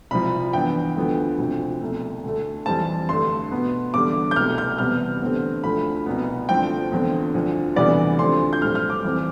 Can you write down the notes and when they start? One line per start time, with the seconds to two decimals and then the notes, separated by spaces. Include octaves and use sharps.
0.11 C2 C3 F3 B5
0.53 G2 E3 B3 G5
0.96 D2 D3 F3 B3
1.38 D2 C3 F3 C4
1.81 C2 B2 A3
2.24 D2 D3 A3
2.66 F2 E3 G3 C4 A5
3.09 G2 D3 A3 C6
3.51 B2 B3
3.94 E2 D3 G3 D6
4.31 G6
4.36 C2 B2 A3 F6
4.58 G6
4.78 E2 C3 G3 B3 F6
5.22 E2 D3 A3 C4
5.63 D2 D3 F3 A3 B5
6.06 C2 B2 B3
6.49 G2 D3 F3 A3 C4 G5
6.92 E2 D3 F3 C4
7.34 D2 D3 F3
7.76 D2 C3 E3 G3 B3 D5
8.19 D2 D3 F3 C4 C6
8.53 G6
8.62 A2 G3 C4 F6
8.75 F6
8.90 D6
9.04 F2 E3 G3 C4